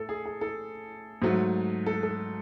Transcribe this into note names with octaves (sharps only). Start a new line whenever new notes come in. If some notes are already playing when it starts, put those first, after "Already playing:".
Already playing: A2 A4
G#4
G#4
A4
G#2 F#3 A3
A4
A4